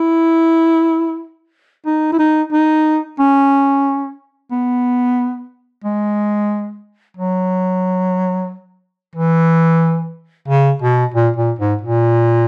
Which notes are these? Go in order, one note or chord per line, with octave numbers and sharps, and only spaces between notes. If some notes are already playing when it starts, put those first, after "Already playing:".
Already playing: E4
D#4
E4
D#4
D#4
C#4
B3
G#3
F#3
E3
C#3
B2
A#2
A#2
G#2
A#2